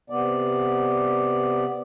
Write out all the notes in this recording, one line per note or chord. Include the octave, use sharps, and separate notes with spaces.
C3 B3 D5